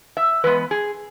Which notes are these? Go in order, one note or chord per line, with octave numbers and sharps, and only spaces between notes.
E5
E3 G#3 B3 B4
G#4